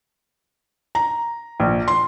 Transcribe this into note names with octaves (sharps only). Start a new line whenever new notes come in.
A#5
A#1
C6